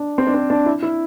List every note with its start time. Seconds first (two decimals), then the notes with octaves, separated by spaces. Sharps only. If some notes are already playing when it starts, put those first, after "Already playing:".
Already playing: D4
0.18 C4
0.27 D4
0.34 C4
0.50 D4
0.66 E4
0.82 E4